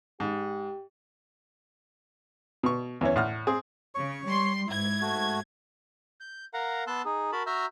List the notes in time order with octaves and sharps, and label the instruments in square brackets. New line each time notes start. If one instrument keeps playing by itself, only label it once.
[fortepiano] G#2 [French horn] G4
[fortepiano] B2 C#6
E2 E3 C#4
A2 F#5 F6
C4 G#4
[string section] C#3 [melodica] C#5 C#6
[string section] G3 C6
[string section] G#2 G#6 [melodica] E4
[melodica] A3 F#4
[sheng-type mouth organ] G6
A#4 F5 F#5 A#5
B3 A5 C6 E6 F#6
D#4 G#4
F#4 A#4 A5 B5
F#4 E5 A#5 E6 F6 G6